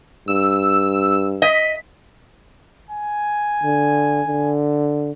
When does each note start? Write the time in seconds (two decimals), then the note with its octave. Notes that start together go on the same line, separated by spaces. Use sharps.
0.28 G2 E6
1.42 D#5 B6
2.90 G#5
3.63 D3
4.28 D3